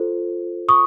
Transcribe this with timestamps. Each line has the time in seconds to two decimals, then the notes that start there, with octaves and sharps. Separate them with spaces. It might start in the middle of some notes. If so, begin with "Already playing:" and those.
Already playing: F4 A4 C5
0.69 C#6 D#6